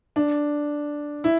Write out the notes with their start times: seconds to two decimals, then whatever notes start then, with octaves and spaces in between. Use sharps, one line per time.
0.16 D4
1.24 E4